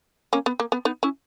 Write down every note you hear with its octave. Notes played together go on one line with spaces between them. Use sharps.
A#3 C#4
B3
A#3
B3
B3 D#4
C#4 E4